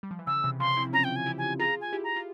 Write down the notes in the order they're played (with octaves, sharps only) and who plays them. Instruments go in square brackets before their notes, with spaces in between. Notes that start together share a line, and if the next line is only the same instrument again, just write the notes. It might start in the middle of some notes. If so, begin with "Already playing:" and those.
[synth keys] G3
F3
E3
[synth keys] C#3 [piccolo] E6
[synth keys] C3 E3
[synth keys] C#3 F3 [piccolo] C6
[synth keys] C4 E4
[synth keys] C#4 F4 [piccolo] A#5
[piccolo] G5
G#5
[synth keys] E4 G4
[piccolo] G#5
[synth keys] F4 G#4 [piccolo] A#5
[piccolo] G#5
[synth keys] E4 G4
[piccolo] A#5
[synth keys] F4